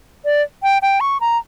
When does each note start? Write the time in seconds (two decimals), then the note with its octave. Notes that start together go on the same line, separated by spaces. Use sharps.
0.25 D5
0.63 G5
0.82 G5
1.00 C#6
1.21 A#5